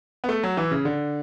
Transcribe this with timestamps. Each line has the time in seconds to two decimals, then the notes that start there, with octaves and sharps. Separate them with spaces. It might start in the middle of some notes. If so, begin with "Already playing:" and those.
0.24 B3
0.29 A3
0.43 F#3
0.57 E3
0.71 C#3
0.85 D3